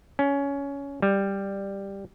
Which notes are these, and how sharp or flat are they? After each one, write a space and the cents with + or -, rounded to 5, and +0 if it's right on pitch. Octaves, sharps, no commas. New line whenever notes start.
C#4 +15
G3 +5